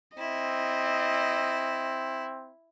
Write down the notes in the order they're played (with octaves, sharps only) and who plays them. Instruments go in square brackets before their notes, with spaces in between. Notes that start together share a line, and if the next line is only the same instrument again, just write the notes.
[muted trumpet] C4 [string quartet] E4 [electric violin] D#5